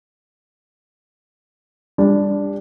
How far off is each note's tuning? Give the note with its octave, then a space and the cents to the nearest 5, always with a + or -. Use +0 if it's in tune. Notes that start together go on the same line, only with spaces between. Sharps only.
G3 +35 D4 -5